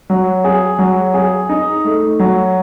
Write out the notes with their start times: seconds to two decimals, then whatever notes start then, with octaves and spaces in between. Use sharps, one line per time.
0.10 F#3
0.44 G#4
0.79 F#3
1.14 G#4
1.49 D#4
1.85 A3
2.19 F#3